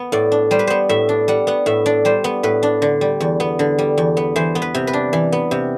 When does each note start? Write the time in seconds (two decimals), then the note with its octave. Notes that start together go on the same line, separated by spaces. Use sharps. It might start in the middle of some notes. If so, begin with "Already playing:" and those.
Already playing: B3
0.12 A2 D5
0.32 D4
0.51 G3 C5
0.59 B4
0.67 B3 C5
0.89 A2 E5
1.09 D4
1.28 G3 F#5
1.47 B3 F#5
1.66 A2 E5
1.86 D4 D5
2.05 G3 C5
2.24 B3
2.43 A2 B4
2.63 D4
2.82 D3
3.01 G3
3.20 E2
3.40 B3
3.59 D3
3.78 G3
3.98 E2
4.17 B3
4.36 E3 C5
4.55 B3
4.62 B4
4.75 C3
4.87 B4
4.93 D4
5.13 E3
5.32 B3
5.51 C3